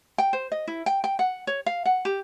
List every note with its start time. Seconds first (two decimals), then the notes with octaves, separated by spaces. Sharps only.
0.18 G5
0.33 C5
0.52 D#5
0.68 E4
0.86 G5
1.04 G5
1.19 F#5
1.47 C#5
1.66 F5
1.86 F#5
2.05 G4